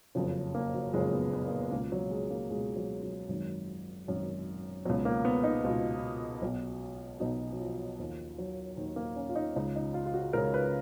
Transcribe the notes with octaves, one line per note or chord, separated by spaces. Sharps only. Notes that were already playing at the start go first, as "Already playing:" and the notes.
F#1 F2 C#3 F#3
A#3
F#3
F#1 F2 C#3 G#3
B3
B3
A#3
B3
C#2 B2 A#3
F#3
G#3
A#3
C#2 B2 G#3
F#3
F#3
G#1 F#2 D#3
G#1 F#2 D#3
C#2 B2 F#3
A#3
B3
D#4
C#2 B2 F4
B1 B2
B1 B2 D#4
F#3
F3
D#2 D#3 F3
F#3
D#2 D#3
A#3
C#4
F4
D#4
C#2 C#3 D#4
D#4
F4
F4
F#4
C#2 C#3 A#4
B4